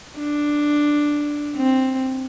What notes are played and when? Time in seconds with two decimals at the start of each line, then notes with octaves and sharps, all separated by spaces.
0.19 D4
1.57 C4